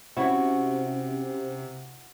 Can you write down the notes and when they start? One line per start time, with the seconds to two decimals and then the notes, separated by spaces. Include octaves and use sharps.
0.17 C3 C#4 E4 F#4 C#5